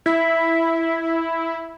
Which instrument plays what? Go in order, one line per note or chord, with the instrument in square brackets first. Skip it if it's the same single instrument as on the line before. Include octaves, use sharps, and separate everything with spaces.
[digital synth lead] E4 [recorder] E5